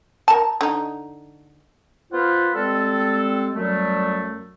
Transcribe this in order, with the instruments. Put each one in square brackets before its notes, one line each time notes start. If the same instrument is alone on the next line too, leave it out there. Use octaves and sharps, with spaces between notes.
[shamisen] A#4 A5
D3 D#4
[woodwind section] B3 F4 C5 F5 F#5 B5
G3 G#3 C4 A4
F#2 F#3 G3 A3